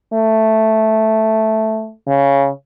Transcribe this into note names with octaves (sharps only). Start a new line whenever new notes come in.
A3
C#3